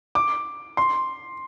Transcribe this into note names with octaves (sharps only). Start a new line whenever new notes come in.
D6
C6